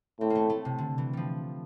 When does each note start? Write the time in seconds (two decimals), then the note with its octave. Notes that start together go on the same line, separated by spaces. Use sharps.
0.20 A2 C4
0.30 A#3
0.35 A3
0.50 A3
0.65 C3
0.78 D3
0.98 E3
1.13 F3 G3